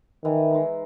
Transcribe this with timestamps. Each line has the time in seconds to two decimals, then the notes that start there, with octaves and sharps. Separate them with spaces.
0.24 D#3 E3
0.51 G#3 D#4